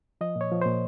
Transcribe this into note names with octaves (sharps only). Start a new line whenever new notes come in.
F3 D#5
A#2
C#5
F3
A#2 C5